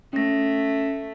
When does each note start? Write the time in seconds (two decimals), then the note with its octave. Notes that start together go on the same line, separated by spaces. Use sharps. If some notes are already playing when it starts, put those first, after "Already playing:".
0.13 A3 C#4 A#6